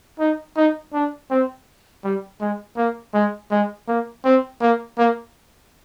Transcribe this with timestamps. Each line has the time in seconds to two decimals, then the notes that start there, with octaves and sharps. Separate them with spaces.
0.20 D#4
0.57 D#4
0.93 D4
1.30 C4
2.04 G3
2.41 G#3
2.77 A#3
3.14 G#3
3.51 G#3
3.88 A#3
4.25 C4
4.62 A#3
4.98 A#3